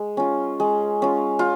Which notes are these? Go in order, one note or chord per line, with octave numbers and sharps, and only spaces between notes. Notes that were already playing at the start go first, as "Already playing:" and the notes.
Already playing: G#3
C#4 F4
G#3
C#4 F4
F4